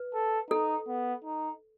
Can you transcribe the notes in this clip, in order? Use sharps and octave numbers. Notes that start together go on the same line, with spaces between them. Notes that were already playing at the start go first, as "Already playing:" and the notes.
Already playing: B4
A4
D#4 A4
B3
D#4